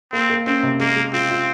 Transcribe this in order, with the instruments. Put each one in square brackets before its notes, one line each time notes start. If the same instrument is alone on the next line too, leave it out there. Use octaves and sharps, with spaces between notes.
[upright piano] A#3 [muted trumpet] C4
[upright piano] A#3
[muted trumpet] C4 [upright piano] C#4
[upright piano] C3
[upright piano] G#3 [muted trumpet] A#3
[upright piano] G#3
[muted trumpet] C4 [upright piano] F4
[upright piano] F4